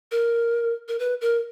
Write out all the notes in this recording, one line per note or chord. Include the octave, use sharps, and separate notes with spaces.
A#4
A#4
B4
A#4